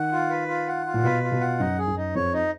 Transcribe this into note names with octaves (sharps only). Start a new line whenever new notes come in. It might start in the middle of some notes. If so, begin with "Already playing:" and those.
Already playing: D#3 F#5
F4
B4
F4
F#5
F4
A#2
B2 B4
F4
B2
F#5
F#2 D#4
G#4
F#2
D#4
F2 C#5
D#4